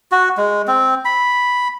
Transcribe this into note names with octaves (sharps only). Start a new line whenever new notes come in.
F#4
G#3
C4
B5